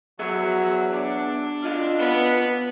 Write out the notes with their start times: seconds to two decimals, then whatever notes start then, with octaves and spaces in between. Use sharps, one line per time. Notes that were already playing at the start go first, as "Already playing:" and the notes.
0.19 F#3 B3 G#4 E5
0.91 D4
1.64 F4 D#5 F5
1.98 B3 F#6